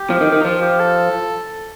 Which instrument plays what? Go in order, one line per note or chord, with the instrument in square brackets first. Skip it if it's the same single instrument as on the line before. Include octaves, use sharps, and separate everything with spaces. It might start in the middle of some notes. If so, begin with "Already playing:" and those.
Already playing: [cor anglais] G4
[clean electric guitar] F3
D#3
D#3
[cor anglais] D#4
[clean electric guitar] F3 [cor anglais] F4
[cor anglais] G4
A4